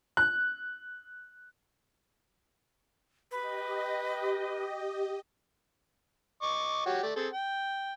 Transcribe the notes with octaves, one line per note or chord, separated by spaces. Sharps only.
F#6
G4 B4 D#5
D#5 C#6 D6
F#4 G4 C#5
A3 D5
C4 G#4 A4
G5